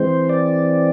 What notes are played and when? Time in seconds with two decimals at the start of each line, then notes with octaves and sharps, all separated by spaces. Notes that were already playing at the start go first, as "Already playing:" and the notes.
Already playing: E3 G#3 C4 C5
0.29 D5